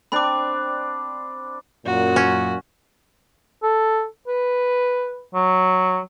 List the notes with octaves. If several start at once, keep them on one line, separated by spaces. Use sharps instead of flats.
C4 D4 D5 B5 D6
F#2 A#2 F#4
C#4
A4
B4
F#3